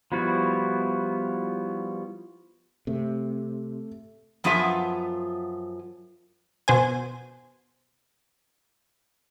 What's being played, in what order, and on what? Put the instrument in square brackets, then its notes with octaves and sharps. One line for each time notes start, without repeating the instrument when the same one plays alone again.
[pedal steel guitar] F3 G3 B3 E4 F#4
[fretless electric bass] C3 [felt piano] A3
[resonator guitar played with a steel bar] F#2 F3 B3 F4 G#4 E5
[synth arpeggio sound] B2 C5 G#5